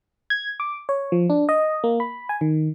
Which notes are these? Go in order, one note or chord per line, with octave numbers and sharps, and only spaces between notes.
G#6
D6
C#5
F3
D4
D#5
A#3
B5
G#5
D#3